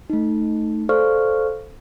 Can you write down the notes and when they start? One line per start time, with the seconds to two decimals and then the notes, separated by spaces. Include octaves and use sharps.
0.10 A3 D#4
0.89 A4 C5 D5 F5 C#6 F6